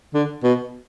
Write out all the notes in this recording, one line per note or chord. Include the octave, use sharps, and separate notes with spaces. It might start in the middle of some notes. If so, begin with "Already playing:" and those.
D3
B2